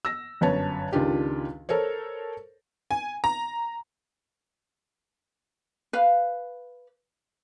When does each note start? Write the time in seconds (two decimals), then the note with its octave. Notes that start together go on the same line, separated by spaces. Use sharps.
0.05 E6 A#6
0.41 G1 F#2 B4 C#5 A5
0.92 C#2 D#3 D4 F4 G4
1.69 A4 A#4 C5 C#5
2.91 G#5
3.24 A#5
5.93 B4 F5